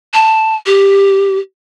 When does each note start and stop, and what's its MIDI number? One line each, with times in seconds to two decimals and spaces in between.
0.14 0.55 81
0.66 1.38 67